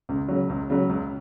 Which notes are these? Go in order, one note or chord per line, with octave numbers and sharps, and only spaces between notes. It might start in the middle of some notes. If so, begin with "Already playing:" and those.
C#2
C#3 F#3
C#2
C#3 F#3
C#2